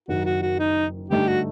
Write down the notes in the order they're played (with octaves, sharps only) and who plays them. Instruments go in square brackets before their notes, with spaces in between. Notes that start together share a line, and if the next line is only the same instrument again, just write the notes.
[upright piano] F#1 F#2 D#3 [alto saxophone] F#4
[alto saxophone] F#4
F#4
D#4
[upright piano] G2 D3 A3 D#4 [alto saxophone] G4
[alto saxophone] F#4